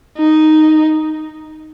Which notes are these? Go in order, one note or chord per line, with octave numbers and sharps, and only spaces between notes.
D#4